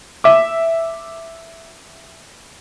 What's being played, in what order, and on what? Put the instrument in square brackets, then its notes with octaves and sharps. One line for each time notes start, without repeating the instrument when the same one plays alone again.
[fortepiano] E5 D6